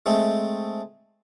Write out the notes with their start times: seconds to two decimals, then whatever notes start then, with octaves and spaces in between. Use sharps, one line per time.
0.06 G#3 A3 C4